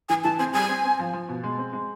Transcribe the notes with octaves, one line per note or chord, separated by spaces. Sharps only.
E3 G#5
E3 A5
C4 G#5
G3 G#5
C4
C4
F3
F3
B2
G#3
C4
G#3